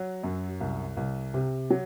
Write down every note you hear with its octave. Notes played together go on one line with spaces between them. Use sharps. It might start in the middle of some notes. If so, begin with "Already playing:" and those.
Already playing: F#3
F#2
C2
C2
C3
F#3